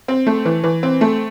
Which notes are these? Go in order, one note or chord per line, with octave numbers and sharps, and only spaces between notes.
C4
A3
E3
E3
C4
A3